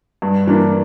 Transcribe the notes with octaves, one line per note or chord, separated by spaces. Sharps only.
G2
E3 A#3 D4